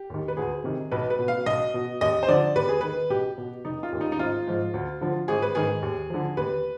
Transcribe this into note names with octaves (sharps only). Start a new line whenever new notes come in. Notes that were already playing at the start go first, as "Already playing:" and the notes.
Already playing: G4
D#2 D#3
B4
D2 G#4
C3 D#3
B1 B4
B4
B2
F5
B1 D#5
B2
D#2 D#5
C5
D3 F3 D5
D#2 B4
G#4
D#3 B4
B1 G4
B2
F1 D#4
F4
D#2 D#3
D#4
D#4
G#1 F4
G#2 F3
D2
D3 F3
G#1 G#4
B4
G#2 D#3 G#4
D#2
D3 F3
D#2 B4